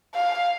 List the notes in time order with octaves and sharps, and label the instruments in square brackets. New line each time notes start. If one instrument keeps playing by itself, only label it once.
[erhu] F5